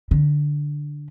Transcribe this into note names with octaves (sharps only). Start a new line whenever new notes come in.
D3